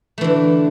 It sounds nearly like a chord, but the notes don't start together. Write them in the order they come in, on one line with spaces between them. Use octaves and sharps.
A3 E3 D3